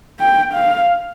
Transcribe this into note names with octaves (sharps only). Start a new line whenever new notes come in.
G5
F5